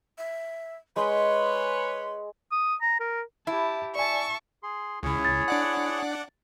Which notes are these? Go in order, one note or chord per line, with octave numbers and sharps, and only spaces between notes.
E5
G#3 B4 C#5 C6
D#6
A#5
A#4
E4 G4 E5 A5
D5 E5 G#5 A5 C#6
G#4 C6
C#2 C#3 E4 G#4 C#5
A6
D4 D5 F#5